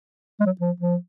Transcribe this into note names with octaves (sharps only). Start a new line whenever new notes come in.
G#3
F#3
F3
F3